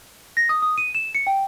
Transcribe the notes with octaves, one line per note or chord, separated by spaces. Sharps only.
A#6
D#6
D#6
D#7
E7
C#7
G5